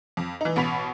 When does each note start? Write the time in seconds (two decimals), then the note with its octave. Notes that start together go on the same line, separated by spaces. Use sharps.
0.17 F2
0.41 E3 D#4
0.56 A1 B2 B5 B6 F7